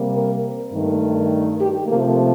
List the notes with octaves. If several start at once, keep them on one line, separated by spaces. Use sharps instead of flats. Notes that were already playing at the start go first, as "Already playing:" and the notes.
Already playing: C3 G3 A#3
A#4
G2 D#3 A3
G4
C3 F3 A3 A#3